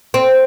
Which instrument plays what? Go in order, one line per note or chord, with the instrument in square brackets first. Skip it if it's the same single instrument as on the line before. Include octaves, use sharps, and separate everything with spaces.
[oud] C4